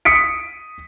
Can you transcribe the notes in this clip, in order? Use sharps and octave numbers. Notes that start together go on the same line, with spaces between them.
D#6 B6 C#7 D7